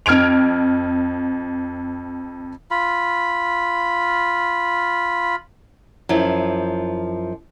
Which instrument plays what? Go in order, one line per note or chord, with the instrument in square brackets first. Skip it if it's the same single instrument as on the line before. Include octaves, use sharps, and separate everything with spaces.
[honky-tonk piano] F2 F6 G#6 D7 F7
[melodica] F4 B5
[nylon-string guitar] F#2 F3 E4